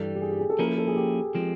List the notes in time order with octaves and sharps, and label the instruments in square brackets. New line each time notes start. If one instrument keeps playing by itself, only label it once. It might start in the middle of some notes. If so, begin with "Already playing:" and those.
Already playing: [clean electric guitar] G2 E3 G3 [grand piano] A4
[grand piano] G4
G#4
G4
G#4
A4
[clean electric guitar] F3 A#3 C#4 E4 [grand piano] A#4
[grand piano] A4
A4
G#4
G4
[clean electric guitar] F3 G#3 C4